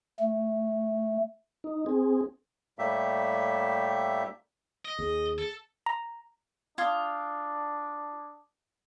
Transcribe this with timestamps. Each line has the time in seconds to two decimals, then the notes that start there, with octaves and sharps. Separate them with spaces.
0.20 A3
1.64 D#4
1.86 C4 G#4
2.79 A2 G3 A#3 G4 E5
4.85 D#5
4.99 D#2 G#4
5.38 A4
5.86 A#5
6.78 D4 F4 D#6 G#6